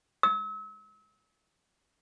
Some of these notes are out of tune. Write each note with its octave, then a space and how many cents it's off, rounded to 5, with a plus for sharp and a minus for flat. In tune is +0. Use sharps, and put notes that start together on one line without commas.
E6 -35